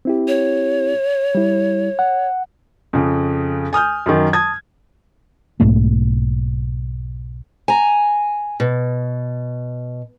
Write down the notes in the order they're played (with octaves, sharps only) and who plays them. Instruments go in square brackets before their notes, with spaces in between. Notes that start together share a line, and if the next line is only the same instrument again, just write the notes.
[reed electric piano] C4 E4 G4
[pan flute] C#5
[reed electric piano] G3 E4
F#5
[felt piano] F2 C#3
G#5 D#6 F6 G6
F#2 D#3
A5 D#6 G#6
[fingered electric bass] B1 G#2 A3 A#3
[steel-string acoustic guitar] G#5 A#5
B2